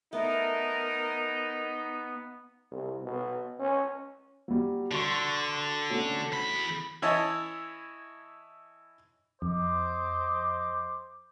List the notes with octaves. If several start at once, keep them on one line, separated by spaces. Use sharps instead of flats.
A3 B3 D#4 A#4
C2
B2
C#4
F#3 G3
D3 F#4 C6 C#6
A3 C#4 F#4
E2 B5
E3 E4 C#5 D#5 A5
F2 C5 D#5 D6